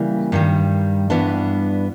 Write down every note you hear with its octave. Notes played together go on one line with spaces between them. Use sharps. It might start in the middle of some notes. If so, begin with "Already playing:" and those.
Already playing: C#3 E3 G3 A#3
G2 D#3 G3
G2 E3 G3 B3 D4